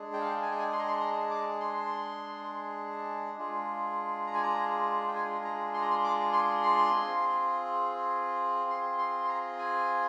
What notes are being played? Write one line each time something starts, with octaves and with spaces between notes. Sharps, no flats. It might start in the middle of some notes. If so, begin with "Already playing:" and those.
Already playing: G#3 D4 G#4
G5
F5
G5
G#5
G5
G#5
C6
A#5
C6
A#5
D6
C6
G#3 D4 F4 G#4
A#5
G#5
A#5
G5
G#5
A#5
C6
A#5
C6
D6
C6
C6
C4 F4 G#4
C6
C6
C6
A#5
G#5